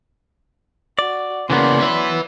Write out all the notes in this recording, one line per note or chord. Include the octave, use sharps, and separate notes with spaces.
F#4 D5
C#3 E3 F#3 A#3 B3 D5 C6
B4 E5